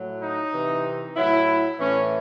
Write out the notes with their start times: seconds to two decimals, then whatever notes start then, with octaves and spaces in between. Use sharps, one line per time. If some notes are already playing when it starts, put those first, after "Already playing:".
Already playing: A2 F#3
0.21 D#4
0.52 C3 E3
1.16 A2 F#3 E4
1.79 A2 E3 C#4